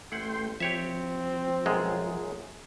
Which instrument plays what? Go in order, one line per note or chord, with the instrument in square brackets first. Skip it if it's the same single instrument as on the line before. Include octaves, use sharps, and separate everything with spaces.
[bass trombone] A1 [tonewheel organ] A3 G5 C6 [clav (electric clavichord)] E4 F#5
[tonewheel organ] F3 [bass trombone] C4 [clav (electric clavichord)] G4 C#5 E5
[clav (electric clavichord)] B1 F#2 G#3 [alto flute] G#4